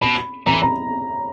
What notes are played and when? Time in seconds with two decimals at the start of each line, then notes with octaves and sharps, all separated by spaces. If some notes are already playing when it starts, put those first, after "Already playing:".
0.02 B2 B5
0.46 E3 A#5
0.53 B5
0.62 A#5